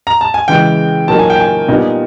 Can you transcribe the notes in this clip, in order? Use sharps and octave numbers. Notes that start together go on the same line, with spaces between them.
A#5
A5
G#5
C#3 E3 G#3 G5
A#2 F#3 A#3 D#4 A5
G#5
G5
G#5
A#2 G3 B3 D#4